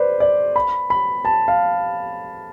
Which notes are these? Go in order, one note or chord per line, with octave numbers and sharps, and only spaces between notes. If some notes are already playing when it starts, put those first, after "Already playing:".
Already playing: B4 C5 D5
D5
B5
B5
A5
F5